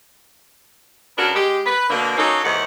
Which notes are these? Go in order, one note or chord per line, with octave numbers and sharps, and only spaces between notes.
C#3 B3 D4 F#4 A#4
G#3 G4
B4
B2 D3 A#3
F#3 A#3 C#4 D#4 A4
D#2 G#2 E3 F#5